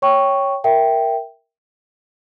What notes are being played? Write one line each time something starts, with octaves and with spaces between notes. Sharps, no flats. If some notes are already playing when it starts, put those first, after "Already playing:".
C#5 G5 C#6
A#4 E5 G5